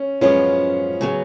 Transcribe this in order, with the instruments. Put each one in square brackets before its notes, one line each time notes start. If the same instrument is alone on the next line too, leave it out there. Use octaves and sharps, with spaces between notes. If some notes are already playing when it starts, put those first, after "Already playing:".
Already playing: [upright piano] C#4
[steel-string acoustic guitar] F#2 F3 G#3 B3 F4 [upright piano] C#4
[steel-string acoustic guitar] C#3 F#3 B3